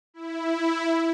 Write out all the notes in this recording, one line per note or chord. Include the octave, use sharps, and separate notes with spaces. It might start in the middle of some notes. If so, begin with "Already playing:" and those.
E4